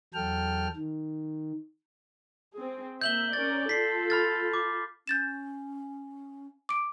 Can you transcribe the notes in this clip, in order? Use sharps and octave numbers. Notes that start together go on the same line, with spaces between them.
E2 F#3 A4 G5 F6
D#3
C4 G#4
A#3 E5 G6 F#7 G7
C#4 A#4 D5 A6
F4 A4 B6 C7
B5 F6 A6
D6
C#4 G6 A6 E7
D6 D7